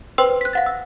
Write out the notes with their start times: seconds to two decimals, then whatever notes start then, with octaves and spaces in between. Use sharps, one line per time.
0.18 B4 C5 G5 C6 E6
0.41 F#6 B6
0.53 F5 F#5 A6
0.66 E6